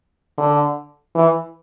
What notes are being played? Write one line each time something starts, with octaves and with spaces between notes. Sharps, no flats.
D3
E3